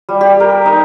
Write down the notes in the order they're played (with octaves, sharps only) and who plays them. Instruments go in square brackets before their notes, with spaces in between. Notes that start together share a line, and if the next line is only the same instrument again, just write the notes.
[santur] G3
G4
A#4
D#4